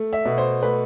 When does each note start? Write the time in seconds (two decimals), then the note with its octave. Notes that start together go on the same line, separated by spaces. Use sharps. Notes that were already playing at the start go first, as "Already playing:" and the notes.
Already playing: A3
0.13 E5
0.25 B2
0.38 C5
0.62 A3 B4